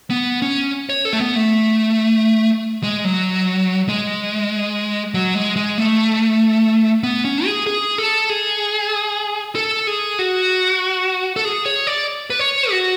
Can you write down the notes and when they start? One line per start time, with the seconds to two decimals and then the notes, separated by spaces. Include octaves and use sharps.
0.10 B3
0.42 C#4
0.89 C#5
1.05 A4
1.13 A3
1.21 B3
1.36 A3
2.83 G#3
3.05 F#3
3.89 G#3
5.14 F#3
5.35 G#3
5.56 G#3
5.78 A3
7.03 B3
7.25 C#4
7.45 G#4
7.67 G#4
7.98 A4
8.29 G#4
9.55 A4
9.87 G#4
10.19 F#4
11.36 A4
11.45 G#4
11.66 C#5
11.87 D5
12.30 B4
12.39 C#5
12.71 F#4